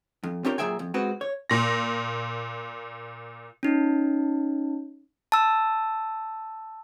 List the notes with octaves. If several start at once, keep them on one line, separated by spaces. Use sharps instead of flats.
F2
C4 D4 F4 G4 A#4 C#5
A#2 F#3 G#4 E5 G5 G#5
F2
G#3 C4 F#4 B4
C#5
A#2 A#6
C#4 D#4
A5 E6